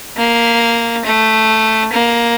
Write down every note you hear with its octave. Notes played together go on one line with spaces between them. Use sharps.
A#3
A3
A#3